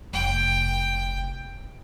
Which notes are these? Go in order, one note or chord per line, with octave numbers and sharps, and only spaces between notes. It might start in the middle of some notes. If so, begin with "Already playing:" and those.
F1 G5